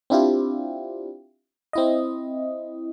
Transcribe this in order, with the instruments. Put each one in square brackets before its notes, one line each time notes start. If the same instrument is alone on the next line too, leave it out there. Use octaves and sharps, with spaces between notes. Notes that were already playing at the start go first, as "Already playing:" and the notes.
[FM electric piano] C4 D4 E4 F4 G4
C4 E4 D#5